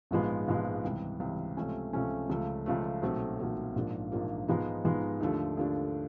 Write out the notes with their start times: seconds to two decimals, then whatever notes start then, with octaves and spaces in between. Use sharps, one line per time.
0.11 A#1 G#2 F3 G#3 B3
0.48 A#1 G#2 F3 G#3 B3
0.84 C#2 C3 E3 G3
1.20 C#2 C3 E3 G3
1.57 C#2 C3 F3 A3 C#4
1.93 C#2 C3 F3 A3 C#4
2.30 C#2 C#3 F3 A3
2.66 C#2 C#3 F3 A3
3.02 B1 A#2 F#3 A3 C4
3.39 B1 A#2 F#3 A3 C4
3.76 A#1 G#2 F3 A#3 D4
4.12 A#1 G#2 F3 A#3 D4
4.48 G#2 F3 G#3 B3 D#4
4.85 G#2 F3 G#3 B3 D#4
5.21 D#2 D3 F3 A3 D4
5.57 D#2 D3 F3 A3 D4